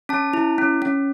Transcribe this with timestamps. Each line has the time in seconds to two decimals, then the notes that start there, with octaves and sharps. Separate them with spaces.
0.09 C#4 A5
0.33 E4
0.58 C#4
0.82 C#4